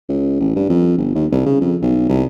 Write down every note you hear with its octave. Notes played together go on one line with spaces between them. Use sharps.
C#2
A1
G2
F2
G1
D#2
C2
C#3
F2
B1
C2